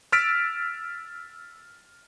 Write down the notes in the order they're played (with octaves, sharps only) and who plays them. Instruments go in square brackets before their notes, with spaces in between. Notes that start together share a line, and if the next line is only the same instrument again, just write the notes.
[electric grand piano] E6 F6 A6 B6 D7